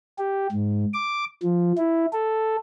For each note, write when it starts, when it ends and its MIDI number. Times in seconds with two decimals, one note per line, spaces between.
0.18 0.47 67
0.52 0.85 44
0.94 1.25 86
1.43 1.72 53
1.77 2.06 64
2.13 2.56 69